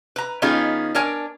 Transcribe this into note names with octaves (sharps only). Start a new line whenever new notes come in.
B4 A#5
D#3 B3 C#4 D#4 F4 G#4
D4 A#4 C#5 G#5